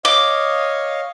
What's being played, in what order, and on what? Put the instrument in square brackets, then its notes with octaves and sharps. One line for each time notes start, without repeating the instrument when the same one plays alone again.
[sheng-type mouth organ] C#5 D#5 F5 [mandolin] D6